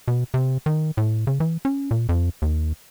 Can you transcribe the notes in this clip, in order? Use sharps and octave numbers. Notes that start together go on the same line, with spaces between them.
B2
C3
D#3
A2
C#3
E3
C#4
A#2
F2
D#2